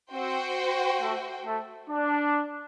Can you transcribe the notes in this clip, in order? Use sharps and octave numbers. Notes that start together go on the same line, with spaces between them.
C4 F#4 C5 G5
A3
A3
D4